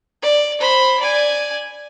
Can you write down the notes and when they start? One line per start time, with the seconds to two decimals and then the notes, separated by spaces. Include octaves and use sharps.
0.22 D5
0.60 C5 B5
1.00 D5 G#5